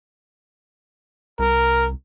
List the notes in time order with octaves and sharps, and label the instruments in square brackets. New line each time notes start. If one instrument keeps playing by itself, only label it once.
[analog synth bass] C2 [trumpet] A#4